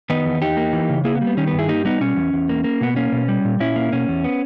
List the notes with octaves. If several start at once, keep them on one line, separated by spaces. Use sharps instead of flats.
D#3 B3 D#4
E2
E2 D#4 G4
A#3
E3
C#3
A#3 E4 G#4
B3
G3
B3
D#3 C#4
B3
G2
E4 G#4
A#3 D#4 G4
G3 B3 D#4
B2 C#4
E2
E2
A#3
A#3
B2 B3
A#3 C#4
B2
G3
A#2
A#2 C#4 E4
A#3
B2 C#4
E2
B3